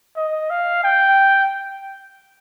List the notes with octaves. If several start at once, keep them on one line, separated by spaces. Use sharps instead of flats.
D#5
F5
G5